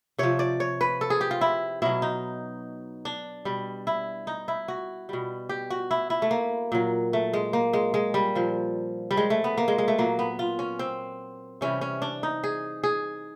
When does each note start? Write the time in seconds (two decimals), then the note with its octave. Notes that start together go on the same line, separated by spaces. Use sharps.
0.18 C3 F3 C#5
0.39 D5
0.60 C#5
0.81 B4
1.01 A4
1.10 G#4
1.21 G4
1.31 F4
1.41 E4
1.82 B2 F#3 E4
2.02 D#4
3.05 D4
3.45 B2 G3
3.87 E4
4.27 D#4
4.48 E4
4.68 F#4
5.09 B2 G3
5.49 G4
5.70 F#4
5.91 E4
6.10 E4
6.22 A3
6.31 A#3
6.72 A#2 F#3
7.13 A3
7.33 G#3
7.53 A#3
7.73 G#3
7.94 G#3
8.14 G3
8.35 A#2 F3
9.11 G3
9.17 G#3
9.30 A3
9.44 B3
9.58 A#3
9.68 G#3
9.78 G#3
9.88 A3
9.98 A#2 F#3 A#3
10.19 B3
10.39 F4
10.59 C#4
10.79 C4
11.61 C3 E3 G3 C#4
11.81 C#4
12.02 D4
12.23 D#4
12.44 G#4
12.84 G#4